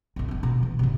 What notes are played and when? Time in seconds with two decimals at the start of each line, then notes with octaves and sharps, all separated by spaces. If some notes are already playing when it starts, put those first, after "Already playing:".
0.16 F#1 B1
0.29 A3 D4
0.43 B2
0.63 E3
0.79 A2 C3